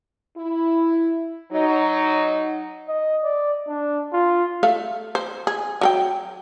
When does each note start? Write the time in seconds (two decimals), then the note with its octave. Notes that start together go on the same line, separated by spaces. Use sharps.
0.36 E4
1.51 F#3 D#4
2.88 D#5
3.24 D5
3.68 D4
4.13 F4
4.63 A3 A4 F5
5.15 C5
5.47 G#4
5.81 F#3 A4 G5